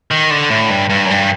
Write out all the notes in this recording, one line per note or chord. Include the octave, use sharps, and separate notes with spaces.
D#3
D3
A2
G2
G2
F#2
G2